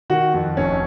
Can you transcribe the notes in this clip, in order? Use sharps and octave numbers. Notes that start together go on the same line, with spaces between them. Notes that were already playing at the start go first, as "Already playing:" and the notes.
D#3 F#4
F2
F1 C#4